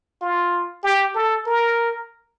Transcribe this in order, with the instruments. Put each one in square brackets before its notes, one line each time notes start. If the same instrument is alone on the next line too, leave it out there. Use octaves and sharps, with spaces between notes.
[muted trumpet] F4
G4
A4
A#4